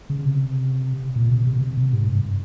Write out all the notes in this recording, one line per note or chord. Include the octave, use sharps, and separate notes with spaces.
C#3
C3
A#2
C3
C3
C3
C3
G#2
G2